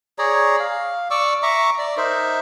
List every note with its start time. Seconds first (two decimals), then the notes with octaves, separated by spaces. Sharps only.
0.19 G#4 C#5 D5 A#5
0.60 F5
1.11 D5 C#6 D6 E6
1.43 E5 A#5 C#6 D6
1.78 D5
1.97 D#4 A#4 C5 E5